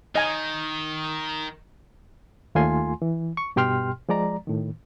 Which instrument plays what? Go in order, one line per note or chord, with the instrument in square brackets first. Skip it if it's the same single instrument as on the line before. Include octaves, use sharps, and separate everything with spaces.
[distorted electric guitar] D#3 [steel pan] D#5 G#5
[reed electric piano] D#2 A3 F4 G#5 C6
E3
C#6
G2 B2 G4 G5 C6 F6
F3 G#3 D5 A#5
A2 D#3